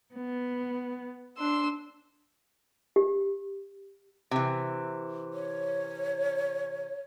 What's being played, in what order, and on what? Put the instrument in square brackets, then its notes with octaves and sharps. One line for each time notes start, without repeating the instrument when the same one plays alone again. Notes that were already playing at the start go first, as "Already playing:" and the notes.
[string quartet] B3
D4 C6 E6
[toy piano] G4
[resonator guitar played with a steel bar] C3 E3
[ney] C#5